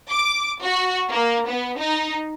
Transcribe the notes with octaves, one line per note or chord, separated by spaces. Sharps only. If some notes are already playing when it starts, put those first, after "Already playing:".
D6
F#4
A#3
B3
D#4